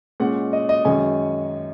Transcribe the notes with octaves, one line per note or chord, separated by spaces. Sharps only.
A#2 G#3 C#4 F#5
D#5
D#5
F#2 D#3 G#3 C#4 G#5